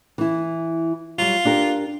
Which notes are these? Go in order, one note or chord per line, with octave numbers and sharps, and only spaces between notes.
E3 E4
F#3 G3 F4
D4 G4 A#4